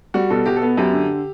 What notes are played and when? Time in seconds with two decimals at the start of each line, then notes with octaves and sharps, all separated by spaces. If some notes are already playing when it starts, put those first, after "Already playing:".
0.14 G3 F#4
0.30 B2 A4
0.46 B2 G4
0.56 A4
0.62 B3
0.77 F#2 G4
0.93 D3